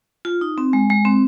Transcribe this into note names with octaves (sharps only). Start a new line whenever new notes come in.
F4
D#4
C4
G#3
G#3
C4